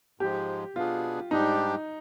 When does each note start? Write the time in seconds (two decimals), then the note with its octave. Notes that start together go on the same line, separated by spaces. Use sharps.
0.19 G#2 F3 G#3 G4
0.75 B2 B3 D4 F4 G#4
1.31 G#2 G3 D4 D#4 G4